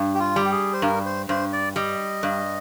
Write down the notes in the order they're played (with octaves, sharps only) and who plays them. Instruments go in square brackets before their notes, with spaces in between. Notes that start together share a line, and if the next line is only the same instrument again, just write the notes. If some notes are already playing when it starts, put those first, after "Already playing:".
Already playing: [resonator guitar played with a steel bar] G2
[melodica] G4
F4
[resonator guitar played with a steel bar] G3
[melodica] G4
G#4
C5
[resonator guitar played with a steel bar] G2 [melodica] A#4
[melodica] C5
[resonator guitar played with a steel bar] G2 [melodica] C5
[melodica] D5
[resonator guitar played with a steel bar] G3 [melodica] D#5
[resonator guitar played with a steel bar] G2